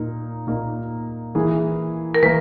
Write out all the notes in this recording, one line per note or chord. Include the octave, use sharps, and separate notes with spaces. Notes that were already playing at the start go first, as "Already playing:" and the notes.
Already playing: A#2 A#3 D#4
A#2 A#3 D#4
E3 A#3 E4 G#4
A#4
E3 A#3 B4